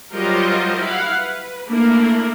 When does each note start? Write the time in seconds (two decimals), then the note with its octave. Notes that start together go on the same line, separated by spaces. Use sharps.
0.14 F#3 G3 F4 A#4 C5 D#5
0.82 E4 F5 F#5
1.18 B4
1.67 A3 A#3 D4 E4 A#4